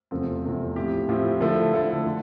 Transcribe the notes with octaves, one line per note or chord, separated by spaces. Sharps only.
E2 C3 F3 A3 C4
E2 C3 F3 A3 C4
A2 F3 C4 E4 G4
A2 F3 C4 E4 G4
D3 F3 A3 E4 A4
D3 F3 A3 E4 A4
D3